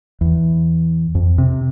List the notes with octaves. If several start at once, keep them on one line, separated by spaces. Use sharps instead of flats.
E2
F2
C3